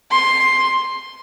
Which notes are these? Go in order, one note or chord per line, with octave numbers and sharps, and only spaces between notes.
C6